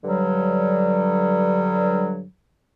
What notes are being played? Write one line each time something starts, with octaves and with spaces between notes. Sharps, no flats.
G2 D3 F#3 G3